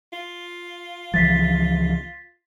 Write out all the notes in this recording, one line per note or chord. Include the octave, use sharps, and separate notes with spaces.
F4
C#2 E3 F3 A6 B6 C7